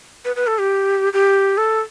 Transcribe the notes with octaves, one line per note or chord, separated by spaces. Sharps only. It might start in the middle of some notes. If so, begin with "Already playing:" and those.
B4
B4
A4
G4
G4
A4